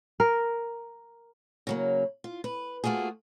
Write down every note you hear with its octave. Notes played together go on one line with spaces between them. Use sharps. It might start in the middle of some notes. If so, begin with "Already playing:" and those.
A#4
C#3 F#3 A#3
F4
B4
A3 A#3 F4 F#4 G#4